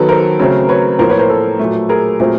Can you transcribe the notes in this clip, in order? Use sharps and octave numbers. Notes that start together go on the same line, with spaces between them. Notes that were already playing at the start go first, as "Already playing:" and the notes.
Already playing: D#3 F#3 B3 A4 B4
A#4 C5
C#3 F#3 A3 C4
B4 C#5
A2 F3 A#3 A#4 C5
B4 C#5
A#4 C5
A4 B4
A#2 F#3 A3
G#4 A#4
A#2 F#3 A3 C4